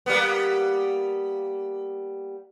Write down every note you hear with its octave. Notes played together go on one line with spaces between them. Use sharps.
G3 A#3 B3